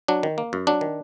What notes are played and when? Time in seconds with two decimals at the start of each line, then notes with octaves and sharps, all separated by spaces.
0.08 F#3 D4
0.23 D#3
0.38 A#3
0.53 F#2
0.67 F#3 D4
0.81 D#3